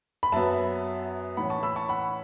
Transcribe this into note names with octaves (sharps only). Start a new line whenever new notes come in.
B5
F#2 F#3 B3 E5 A5
A2 E3 C#4 F#5 B5
A5 C#6
B5 E6
A5 C#6
F#5 B5